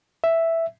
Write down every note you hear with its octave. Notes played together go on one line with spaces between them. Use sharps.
E5